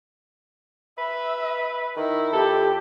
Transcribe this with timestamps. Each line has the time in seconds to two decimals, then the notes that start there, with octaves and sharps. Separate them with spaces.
0.98 B4 E5
1.96 D#3 E4
2.33 F2 G4 A4